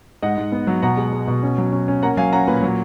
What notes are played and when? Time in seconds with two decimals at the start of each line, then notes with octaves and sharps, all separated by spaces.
0.22 G#2 D#5 F#5
0.37 G#2
0.52 B3
0.67 F#3
0.82 B2 F#5 A#5
0.97 G#3
1.13 G#3
1.28 B2
1.43 C#4
1.58 F#3
1.72 C#4
1.88 C#4
2.03 A#3 F#5 A#5
2.17 F#3 F5 G#5
2.33 C#4 F#5 A#5
2.47 A#2 B4
2.63 F#3